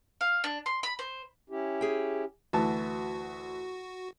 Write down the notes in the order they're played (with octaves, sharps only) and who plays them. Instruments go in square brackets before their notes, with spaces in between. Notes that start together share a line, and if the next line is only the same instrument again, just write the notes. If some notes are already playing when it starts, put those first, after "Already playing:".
[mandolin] F5
D4
C6
B5
C5
[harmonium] C#4 E4 G4
[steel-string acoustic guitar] G#4 G5
[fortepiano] D2 E3 A5 [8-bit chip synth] F#4